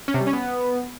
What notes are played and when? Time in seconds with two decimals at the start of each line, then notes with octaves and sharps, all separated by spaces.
0.08 C#4
0.14 C3
0.20 G3
0.27 C#4
0.33 B3